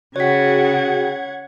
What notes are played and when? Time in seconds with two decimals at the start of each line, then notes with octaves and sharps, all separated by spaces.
0.16 C#3 F#4 G#4 C#5 F#5 G5 G#6 B6